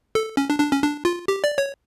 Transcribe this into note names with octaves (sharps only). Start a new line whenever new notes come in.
A4
C#4
D4
D4
C#4
D4
F4
G4
D5
C#5